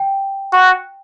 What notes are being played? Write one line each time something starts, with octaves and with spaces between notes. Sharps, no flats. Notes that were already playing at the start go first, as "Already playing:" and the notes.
Already playing: G5
F#4